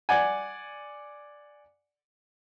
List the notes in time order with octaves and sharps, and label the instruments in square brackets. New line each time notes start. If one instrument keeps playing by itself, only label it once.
[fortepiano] D5 F#5 G#5